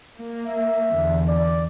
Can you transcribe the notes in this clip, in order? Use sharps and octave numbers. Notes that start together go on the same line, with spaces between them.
A#3
E5
E2 D3
D5